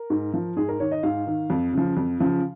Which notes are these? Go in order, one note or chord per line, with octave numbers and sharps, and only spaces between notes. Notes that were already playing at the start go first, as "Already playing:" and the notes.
Already playing: A#4
G#2
F3
G#2 G#4
A#4
D#3 C#5
D#5
G#2 F5
D#3
F2
C#3 F3
F2
C#3 F3